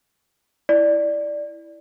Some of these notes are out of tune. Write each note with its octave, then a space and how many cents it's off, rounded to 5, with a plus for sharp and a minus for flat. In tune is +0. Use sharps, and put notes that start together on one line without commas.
E4 +0 D5 +0